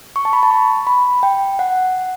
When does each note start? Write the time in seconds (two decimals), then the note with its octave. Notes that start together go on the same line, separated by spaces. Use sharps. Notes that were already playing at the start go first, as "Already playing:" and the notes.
0.16 C#6
0.25 A5
0.33 B5
0.43 A5
0.51 C#6
0.87 B5
1.23 G5
1.59 F#5